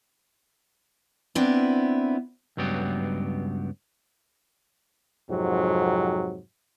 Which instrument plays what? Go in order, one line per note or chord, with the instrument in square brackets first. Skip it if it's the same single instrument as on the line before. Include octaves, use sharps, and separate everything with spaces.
[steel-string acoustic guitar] B3 C4 D4 E4
[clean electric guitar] C#2 G2 F#3 B3 G4
[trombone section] F2 G#2 C3 F#3